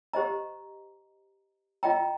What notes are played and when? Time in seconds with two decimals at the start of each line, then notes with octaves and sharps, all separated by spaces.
0.13 G4 C5 D#5 A#5
1.83 F4 D#5 G5 A#5